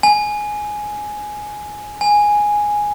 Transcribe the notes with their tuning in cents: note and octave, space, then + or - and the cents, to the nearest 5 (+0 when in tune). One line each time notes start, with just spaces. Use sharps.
G#5 +10
G#5 +0